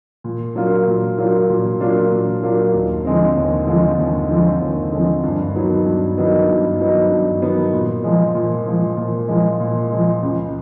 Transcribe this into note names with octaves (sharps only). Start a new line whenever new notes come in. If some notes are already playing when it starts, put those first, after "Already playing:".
A#2
F#3 A#3 D4 F4
A#2
F#3 A#3 D4 F4
A#2
F#3 A#3 D4 F4
A#2
F#3 A#3 D4 F4
D#2
D3 F3 G#3 C4
D#2
D3 F3 G#3 C4
D#2
D3 F3 G#3 C4
D#2
D3 F3 G#3 C4
G2
D#3 F#3 B3 D#4
G2
D#3 F#3 B3 D#4
G2
D#3 F#3 B3 D#4
G2
D#3 F#3 B3 D#4
A#2
F3 G#3
A#2
F3 G#3
A#2
F3 G#3
A#2
F3 G#3
C#2